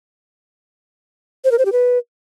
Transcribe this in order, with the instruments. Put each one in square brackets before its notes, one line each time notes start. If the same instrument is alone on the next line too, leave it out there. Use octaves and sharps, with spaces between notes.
[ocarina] C5
A#4
C5
G4
B4